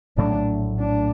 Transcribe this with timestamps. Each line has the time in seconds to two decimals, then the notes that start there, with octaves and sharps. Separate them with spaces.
0.17 A#1 A2 F#3 A3 D4
0.80 D4